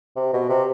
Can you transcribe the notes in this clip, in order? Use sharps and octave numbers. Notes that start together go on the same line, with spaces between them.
C3
B2
C3